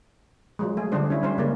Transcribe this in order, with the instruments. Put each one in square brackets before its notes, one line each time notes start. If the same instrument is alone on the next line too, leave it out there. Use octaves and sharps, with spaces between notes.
[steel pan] F3 F#3 G#3
A3 G#4
D3 F3 G3 D4 C5
C#4 E4
G3 C#4 C5
C#3 G#3 A#3 C#4